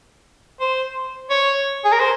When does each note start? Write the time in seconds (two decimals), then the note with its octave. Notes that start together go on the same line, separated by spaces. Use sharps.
0.61 C5
1.30 C#5
1.85 G#4
1.92 A#4
2.00 C5